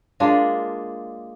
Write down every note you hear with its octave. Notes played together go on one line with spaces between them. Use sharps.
G#3 A#3 D4 F4